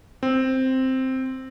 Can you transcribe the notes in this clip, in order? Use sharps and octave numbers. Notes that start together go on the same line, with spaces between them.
C4